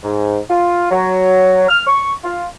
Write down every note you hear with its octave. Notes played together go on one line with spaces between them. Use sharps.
G#2
F4
F#3
F6
C#6
F4